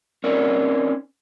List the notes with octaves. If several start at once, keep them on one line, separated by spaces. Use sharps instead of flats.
C4 C#4 D#4 A#4 C#5 D5